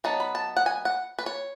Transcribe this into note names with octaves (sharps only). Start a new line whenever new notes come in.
F#3 B3 D#4 A5
B5
A5
F#5
G#5
F#5
B4
C#5